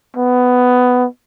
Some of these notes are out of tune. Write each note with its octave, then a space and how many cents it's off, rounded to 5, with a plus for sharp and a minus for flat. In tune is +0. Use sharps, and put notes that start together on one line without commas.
B3 +10